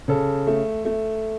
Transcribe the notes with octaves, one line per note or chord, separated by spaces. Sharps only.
C#3 A4
A3
A3